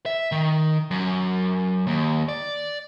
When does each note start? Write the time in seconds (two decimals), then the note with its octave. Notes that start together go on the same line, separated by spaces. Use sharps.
0.06 E5
0.32 D#3
0.91 F#2
1.87 D#2
2.29 D5